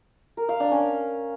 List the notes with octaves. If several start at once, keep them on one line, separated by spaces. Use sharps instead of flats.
A#4
F5
D4
C#4